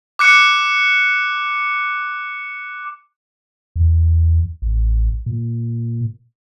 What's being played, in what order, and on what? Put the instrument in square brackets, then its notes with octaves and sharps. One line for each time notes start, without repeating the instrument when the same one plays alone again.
[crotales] D6 F#6 C#7
[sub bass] E2
A1
A#2